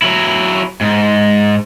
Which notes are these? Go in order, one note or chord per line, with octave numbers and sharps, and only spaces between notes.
F#3 E4
G#2